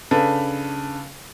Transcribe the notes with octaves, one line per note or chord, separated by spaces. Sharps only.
C#3 D4 A4 B4